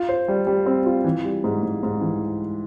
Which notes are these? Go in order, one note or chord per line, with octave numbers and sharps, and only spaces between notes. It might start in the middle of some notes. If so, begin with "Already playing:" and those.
Already playing: F4
C5
G3
G3
C4
F4
E3
G3
G#2
G#2
G#2
E3